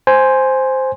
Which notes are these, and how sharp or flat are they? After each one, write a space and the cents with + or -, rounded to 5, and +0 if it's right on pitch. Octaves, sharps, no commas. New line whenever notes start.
C5 +0 G#5 +0